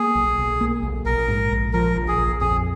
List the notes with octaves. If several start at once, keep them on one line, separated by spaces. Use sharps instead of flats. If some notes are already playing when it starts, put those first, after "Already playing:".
Already playing: A#3 G#4
B1
B1
A#3
B1
A#1 A#4
G#2
A#1
F3 A#4
A#1
G#4
A#1
F2 G#4